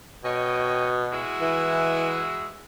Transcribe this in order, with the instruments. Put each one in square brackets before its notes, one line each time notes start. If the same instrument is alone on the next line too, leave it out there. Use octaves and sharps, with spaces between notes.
[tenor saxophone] B2 [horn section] C#5 D#5 G5
[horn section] G#3 E4 F#4
[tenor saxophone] E3